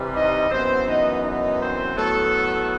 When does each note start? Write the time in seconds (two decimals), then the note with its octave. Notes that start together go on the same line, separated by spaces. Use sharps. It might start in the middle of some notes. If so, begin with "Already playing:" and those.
Already playing: C3 E3 G3
0.13 D#4 D#5
0.49 F#2 E3 B3 C4 C5
0.86 D#4 D#5
1.22 D#4 D#5
1.59 C4 C5
1.95 A2 F#3 A3 B3 A4